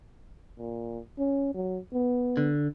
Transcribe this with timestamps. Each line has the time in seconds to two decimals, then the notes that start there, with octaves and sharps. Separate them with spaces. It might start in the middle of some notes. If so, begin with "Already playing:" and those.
0.58 A#2
1.18 C#4
1.54 F#3
1.93 B3
2.37 D3